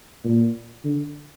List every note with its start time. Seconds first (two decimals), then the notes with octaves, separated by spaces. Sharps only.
0.24 A#2
0.84 D3